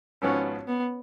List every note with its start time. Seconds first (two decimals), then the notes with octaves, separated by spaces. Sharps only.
0.22 G#1 G#2 F3 B3 C#4 F#4
0.68 B3